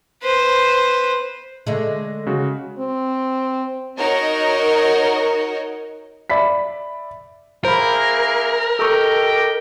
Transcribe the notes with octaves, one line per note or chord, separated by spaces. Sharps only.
B4 C5
D3 G#3 A3
C#3 G#3 F#4
C4
D#4 F#4 A#4 C#5 D#5
D5 E5 B5 B6
A#3 E4 G#4 A#4 C5 B5
G4 A4 D#5 G5 C#6